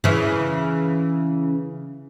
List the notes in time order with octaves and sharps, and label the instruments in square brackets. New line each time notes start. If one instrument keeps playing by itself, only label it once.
[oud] C#3 E3